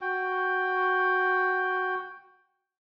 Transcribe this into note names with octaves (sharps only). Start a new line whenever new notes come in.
F#4 G5